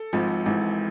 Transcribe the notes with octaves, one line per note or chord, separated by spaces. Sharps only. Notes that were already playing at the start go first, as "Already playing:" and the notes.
Already playing: A4
G#1 G#2 F3
G#1 G#2 E3